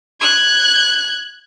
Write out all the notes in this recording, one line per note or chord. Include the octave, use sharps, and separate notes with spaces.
F#6 G#6